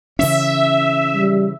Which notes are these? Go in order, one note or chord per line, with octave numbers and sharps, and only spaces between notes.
C#3 E3 C#4 E5
G3